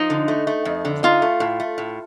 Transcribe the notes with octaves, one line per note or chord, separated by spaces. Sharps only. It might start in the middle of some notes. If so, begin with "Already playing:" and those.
Already playing: F3 D#4
D3
A3
A3
F2
D3
D#4 F4
A3
A2
A3
A2